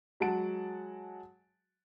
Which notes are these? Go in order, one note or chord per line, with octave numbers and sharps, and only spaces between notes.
F#3 G#3 F#4 F#5 A5 D7